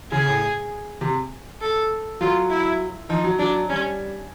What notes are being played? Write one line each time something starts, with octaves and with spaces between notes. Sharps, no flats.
C#3 G#4
A2
C3
A4
F#3 F4
E4
F3 D#4
F#3
F#3 D4
G3 C#4